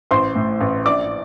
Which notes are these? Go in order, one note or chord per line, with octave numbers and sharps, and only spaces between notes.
A1 C5 C6
A2
A1
A#1 D5 D6